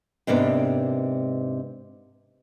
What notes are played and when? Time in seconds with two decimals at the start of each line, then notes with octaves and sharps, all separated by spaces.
0.27 G#2 C3 A#3 B3 D4